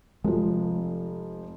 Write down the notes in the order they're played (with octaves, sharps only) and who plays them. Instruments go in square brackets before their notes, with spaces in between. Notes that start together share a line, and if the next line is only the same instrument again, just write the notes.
[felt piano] F1 F3 [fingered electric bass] G#3